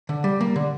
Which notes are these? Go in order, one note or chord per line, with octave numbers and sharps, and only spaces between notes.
D3
G3
A#3
D3